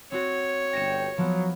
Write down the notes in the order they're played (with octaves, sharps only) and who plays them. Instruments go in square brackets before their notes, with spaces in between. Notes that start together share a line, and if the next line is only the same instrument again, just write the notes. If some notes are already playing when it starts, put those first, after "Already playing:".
[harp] C4 F#4 [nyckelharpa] C#5
[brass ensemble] G1 G5 [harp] A#6 C#7 E7
[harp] F3 B3 [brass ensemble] F#3